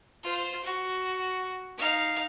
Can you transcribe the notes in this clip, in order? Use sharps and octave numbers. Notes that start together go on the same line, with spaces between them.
F4 C5
F#4
D#4 F5